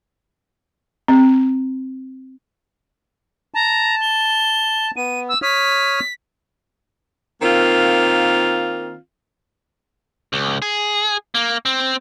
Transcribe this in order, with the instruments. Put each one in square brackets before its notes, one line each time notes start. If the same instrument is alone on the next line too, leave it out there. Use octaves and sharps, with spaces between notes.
[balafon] C4
[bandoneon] A5 [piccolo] A#5
[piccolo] G7
[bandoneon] B3 [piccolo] D#7
[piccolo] E6
[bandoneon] C#5 D#6 F6 [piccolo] B6
[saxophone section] D#3 A#3 C4 F4
[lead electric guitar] C#2
G#4
A#3
C4